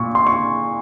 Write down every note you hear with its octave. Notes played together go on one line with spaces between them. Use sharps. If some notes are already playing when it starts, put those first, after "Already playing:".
Already playing: A#2 C#6
C6
C#6